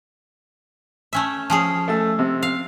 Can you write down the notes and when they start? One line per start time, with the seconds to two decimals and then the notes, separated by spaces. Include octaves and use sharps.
1.13 A3 C#4 E5
1.50 F3 C#4 G#4
1.88 A3 E6
2.19 C3
2.43 F5